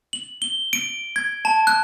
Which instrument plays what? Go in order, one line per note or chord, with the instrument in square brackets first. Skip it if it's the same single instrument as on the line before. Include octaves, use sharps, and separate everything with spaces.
[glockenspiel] F#7
G7
D7
G#6
A5
F#6